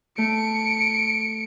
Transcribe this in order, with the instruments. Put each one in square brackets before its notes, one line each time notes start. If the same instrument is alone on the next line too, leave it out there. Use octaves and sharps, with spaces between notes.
[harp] A3 [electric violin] C#7 D7